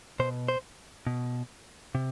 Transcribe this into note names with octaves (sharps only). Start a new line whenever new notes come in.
B2 C5
C5
B2
C3